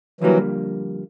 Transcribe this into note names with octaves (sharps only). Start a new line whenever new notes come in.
F2 D3 E3 F#3 G3 A#3